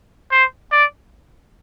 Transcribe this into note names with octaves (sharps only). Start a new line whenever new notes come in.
C5
D5